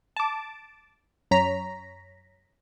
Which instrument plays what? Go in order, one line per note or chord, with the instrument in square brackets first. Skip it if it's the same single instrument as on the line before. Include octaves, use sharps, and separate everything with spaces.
[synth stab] A5 D6
F#2 C#5 A#5 B6